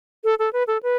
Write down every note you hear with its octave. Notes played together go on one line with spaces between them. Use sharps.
A4
A4
B4
A4
B4